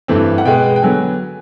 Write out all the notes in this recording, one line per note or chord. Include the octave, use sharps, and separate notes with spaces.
G2 E3 A3 C4
F#5
B2 G#3 B3 G5
G5
D3 F#3 B3 G#5